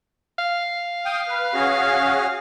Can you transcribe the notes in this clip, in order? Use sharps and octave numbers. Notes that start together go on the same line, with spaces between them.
F5
G5 D#6
B4
C#4 F#4 G#4